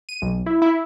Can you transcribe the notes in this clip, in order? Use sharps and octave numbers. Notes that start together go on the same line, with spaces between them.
D#7
B1
E4
E4